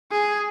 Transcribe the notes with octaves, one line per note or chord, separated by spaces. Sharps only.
G#4